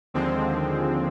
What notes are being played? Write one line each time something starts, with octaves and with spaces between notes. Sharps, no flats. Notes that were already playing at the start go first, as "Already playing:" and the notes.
D#2 D3 F3 G#3 C4